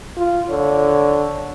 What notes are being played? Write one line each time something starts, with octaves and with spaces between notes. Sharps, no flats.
F4
D3 C#5